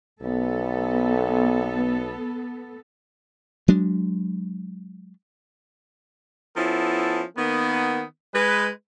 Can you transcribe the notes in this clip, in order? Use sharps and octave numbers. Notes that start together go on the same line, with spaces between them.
B1 B3 A4
F#3 G#3 D4
F3 B3 C#4 E4 A4
D#3 A#3 B3
G#3 B4